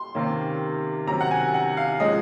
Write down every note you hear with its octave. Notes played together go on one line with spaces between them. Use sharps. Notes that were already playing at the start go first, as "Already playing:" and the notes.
Already playing: C6
C3 D#3 A#3 C#4
C3 D#3 F#3 C#4 A#5
F#5
G#5
F#5
F5
F3 G#3 C#4 D#5